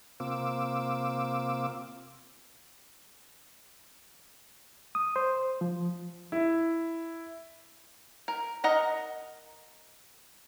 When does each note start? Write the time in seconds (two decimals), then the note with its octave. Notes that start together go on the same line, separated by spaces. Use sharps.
0.20 C3 A#3 C4 F4 D6 E6
4.95 D#6
5.16 C5
5.61 F3
6.32 E4
8.28 A#4
8.64 A#4 D#5 F#5 A#5